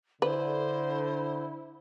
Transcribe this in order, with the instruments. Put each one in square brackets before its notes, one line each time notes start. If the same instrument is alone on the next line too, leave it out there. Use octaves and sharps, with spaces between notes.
[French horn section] D3 [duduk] E4 [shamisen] B4 [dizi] C5